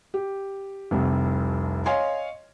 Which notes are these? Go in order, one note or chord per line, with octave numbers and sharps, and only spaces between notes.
G4
F1 C2 G3
C#5 D#5 F5 G#5 C6